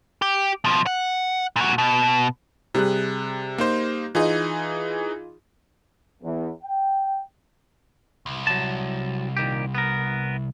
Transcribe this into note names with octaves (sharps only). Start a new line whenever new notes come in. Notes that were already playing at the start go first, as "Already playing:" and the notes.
G4
B2 F3
F#5
A#2 F#4
B2
C3 G3 G#4 F#6
A#3 D#4 C5
E3 D#4 F4 G#4 D#5
E2
G5
C2
F#3 A5
A#2 D#3 G4
B3 A#4